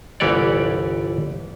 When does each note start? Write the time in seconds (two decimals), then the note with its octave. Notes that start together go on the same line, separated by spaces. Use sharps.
0.20 G1 C2 E3 G4 C#5 D5